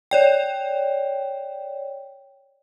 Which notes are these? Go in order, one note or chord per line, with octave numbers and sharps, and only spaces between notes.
C#5 D5 G5